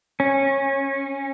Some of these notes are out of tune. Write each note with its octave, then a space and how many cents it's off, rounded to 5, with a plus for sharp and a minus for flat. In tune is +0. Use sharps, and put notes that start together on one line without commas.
C#4 -20